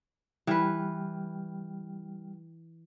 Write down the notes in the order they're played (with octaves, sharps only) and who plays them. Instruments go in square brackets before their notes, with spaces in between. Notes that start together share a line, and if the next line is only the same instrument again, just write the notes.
[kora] E3 B4 [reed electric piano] G3 G5 F6